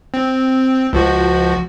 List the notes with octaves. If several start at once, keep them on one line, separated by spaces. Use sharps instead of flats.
C4
C#2 F3 F#4